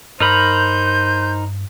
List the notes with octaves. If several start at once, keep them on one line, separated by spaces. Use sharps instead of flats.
G2 D#4 A#4 C5 B5 G6